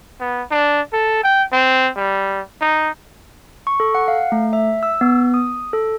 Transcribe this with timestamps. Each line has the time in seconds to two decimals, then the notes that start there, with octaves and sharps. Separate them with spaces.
0.20 B3
0.51 D4
0.93 A4
1.23 G5
1.53 C4
1.96 G3
2.61 D#4
3.67 C#6
3.80 A4
3.95 F#5
4.08 F5
4.32 A3
4.53 E5
4.83 E6
5.01 B3
5.34 D#6
5.73 A4